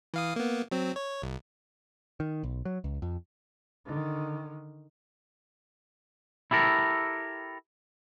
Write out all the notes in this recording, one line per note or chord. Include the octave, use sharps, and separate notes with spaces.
E3 F5 D#6
A#3 B3
F#3 C4
C#5
C2
D#3
B1
F#3
C#2
F2
D3 D#3
E4 G4 A4 A#4